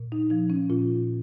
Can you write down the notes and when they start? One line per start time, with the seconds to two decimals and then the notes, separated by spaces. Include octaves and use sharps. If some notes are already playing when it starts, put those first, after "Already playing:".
Already playing: A#2
0.12 D#4
0.30 F3 D#4
0.50 C#4
0.70 A#2 F4